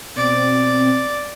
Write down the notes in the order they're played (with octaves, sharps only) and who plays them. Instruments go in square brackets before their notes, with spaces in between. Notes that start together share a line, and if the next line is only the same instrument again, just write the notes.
[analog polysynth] B2 C4 [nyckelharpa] D5